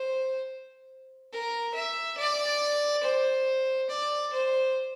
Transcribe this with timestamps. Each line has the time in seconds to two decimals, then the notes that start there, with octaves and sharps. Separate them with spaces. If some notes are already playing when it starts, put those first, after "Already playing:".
Already playing: C5
1.32 A#4
1.75 E5
2.18 D5
3.04 C5
3.90 D5
4.33 C5